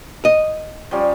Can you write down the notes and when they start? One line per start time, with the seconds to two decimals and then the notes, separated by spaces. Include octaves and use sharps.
0.25 D#5
0.91 F3 G3 C#4